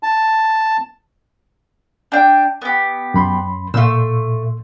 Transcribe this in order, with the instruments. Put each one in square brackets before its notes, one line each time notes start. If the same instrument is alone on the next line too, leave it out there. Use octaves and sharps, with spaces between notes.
[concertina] A5
[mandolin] D4 G5
B3 G4
[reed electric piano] F#2 B5 C6
[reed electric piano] A#2 C6 [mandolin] A3 E6